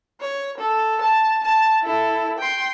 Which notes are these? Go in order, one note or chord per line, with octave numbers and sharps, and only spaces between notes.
C#5
A4
A5
A5
E4 A4
G5 C6